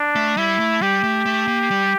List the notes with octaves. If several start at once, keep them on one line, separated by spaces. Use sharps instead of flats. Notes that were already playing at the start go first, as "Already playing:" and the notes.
Already playing: D4
A3
G3 E4
A3
G3 G4
A3
A3
A#3
G3